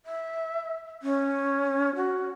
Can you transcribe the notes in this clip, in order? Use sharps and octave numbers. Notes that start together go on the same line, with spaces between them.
E5
C#4
F#4